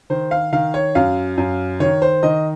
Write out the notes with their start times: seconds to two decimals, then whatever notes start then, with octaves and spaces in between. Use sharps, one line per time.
0.10 D#3 C5
0.31 F5
0.53 D#3 F5
0.74 C#5
0.95 F#2 F5
1.38 F#2
1.80 D#3 C#5
2.02 C5
2.23 D#3 D#5